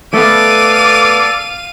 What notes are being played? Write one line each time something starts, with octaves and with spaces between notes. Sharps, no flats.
A3 B3 A4 D5 F5 D6 D#7